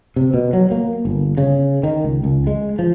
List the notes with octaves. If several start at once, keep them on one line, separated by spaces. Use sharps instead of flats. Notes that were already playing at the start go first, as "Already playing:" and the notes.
C3
B2
F#3
A#3
G1
C#3
D#3
C#2
C#2
G#3
F3